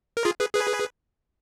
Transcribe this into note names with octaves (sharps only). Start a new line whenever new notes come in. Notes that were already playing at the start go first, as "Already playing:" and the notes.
A#4
F4 G#4
G#4 B4
G#4 B4